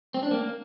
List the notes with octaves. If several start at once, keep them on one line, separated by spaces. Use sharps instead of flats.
C4
D4
A#3